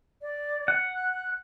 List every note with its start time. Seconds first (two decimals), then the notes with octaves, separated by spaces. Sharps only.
0.22 D5
0.68 F#5
0.93 F#6